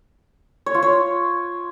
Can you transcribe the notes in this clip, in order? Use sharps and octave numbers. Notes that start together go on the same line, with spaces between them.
C#5
F4
C#5